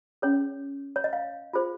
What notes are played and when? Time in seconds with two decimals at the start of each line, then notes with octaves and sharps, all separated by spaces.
0.22 C#4 G#4 C#5
0.96 C#5
1.04 D#5
1.13 F5
1.53 F4 G#4 C5